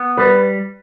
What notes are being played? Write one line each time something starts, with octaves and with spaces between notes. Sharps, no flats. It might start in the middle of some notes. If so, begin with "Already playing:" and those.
Already playing: B3
G3 B4